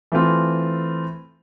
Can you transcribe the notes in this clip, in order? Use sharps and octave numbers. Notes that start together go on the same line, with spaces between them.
E3 A3 C4 F4